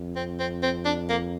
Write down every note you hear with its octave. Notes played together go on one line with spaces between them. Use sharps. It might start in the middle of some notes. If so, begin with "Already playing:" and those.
Already playing: F2
C4
C4
C4
D4
A#3